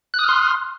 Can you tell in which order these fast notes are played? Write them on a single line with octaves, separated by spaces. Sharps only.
F#6 D#6 F6 C6